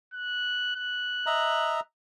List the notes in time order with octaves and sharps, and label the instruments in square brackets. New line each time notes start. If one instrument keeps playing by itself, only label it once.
[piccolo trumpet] F#6
F#6
[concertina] D#5 E5 A#5